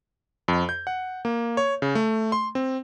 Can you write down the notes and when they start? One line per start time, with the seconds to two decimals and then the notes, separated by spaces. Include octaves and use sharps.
0.48 F2
0.69 G6
0.87 F#5
1.25 A#3
1.57 C#5
1.82 C#3
1.95 A3
2.32 C6
2.55 C4